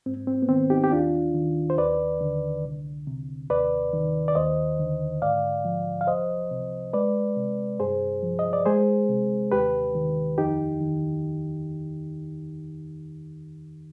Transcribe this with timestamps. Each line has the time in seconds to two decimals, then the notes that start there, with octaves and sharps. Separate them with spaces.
0.06 G#2 C4
0.27 C4
0.42 B3
0.48 D#3 C4
0.70 D#4 G4
0.84 G4
0.92 D#2 D4 F4
1.34 D#3
1.70 C5
1.78 D#2 B4 D5
2.21 D3
2.65 C2
3.07 C3
3.50 D#2 B4 D5
3.93 D#3
4.28 D5
4.35 D#2 C5 D#5
4.79 D3
5.22 G#2 D5 F5
5.65 F3
6.01 F5
6.07 C2 C5 D#5
6.51 C3
6.93 G#3 B4 D5
7.37 C3
7.80 G2 G#4 C5
8.23 F3
8.39 D#5
8.53 D5
8.66 G#3 G#4 C5
9.09 C3
9.52 D#2 G4 B4
9.95 D#3
10.38 F2 D#4 G4
10.81 D#3